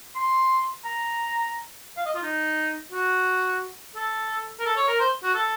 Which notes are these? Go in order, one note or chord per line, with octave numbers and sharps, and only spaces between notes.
C6
A#5
F5
D#5
F4
D#4
F#4
A4
A#4
A4
C#5
A#4
C5
F#4
A4